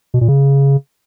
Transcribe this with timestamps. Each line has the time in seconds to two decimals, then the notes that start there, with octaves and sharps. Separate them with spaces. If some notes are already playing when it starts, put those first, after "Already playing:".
0.14 B2
0.21 A#2
0.28 C#3